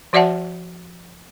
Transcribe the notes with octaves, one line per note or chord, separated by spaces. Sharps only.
F3 F#4 D5 E5 F#5 A5